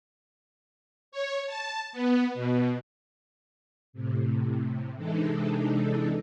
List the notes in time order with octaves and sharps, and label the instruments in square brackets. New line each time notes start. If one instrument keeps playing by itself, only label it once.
[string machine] C#5
A5
B3
B2
A2 C3
C3 E3 G#3 D4 D#4 A4